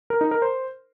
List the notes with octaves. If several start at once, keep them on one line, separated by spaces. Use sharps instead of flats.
A#4
D#4
A#4
C5